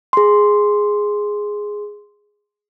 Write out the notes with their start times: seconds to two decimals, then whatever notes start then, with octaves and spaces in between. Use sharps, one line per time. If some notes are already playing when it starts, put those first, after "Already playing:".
0.13 G#4 C6